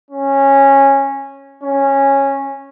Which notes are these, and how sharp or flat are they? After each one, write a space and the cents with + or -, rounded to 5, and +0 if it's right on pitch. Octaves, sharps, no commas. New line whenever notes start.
C#4 -15
C#4 -10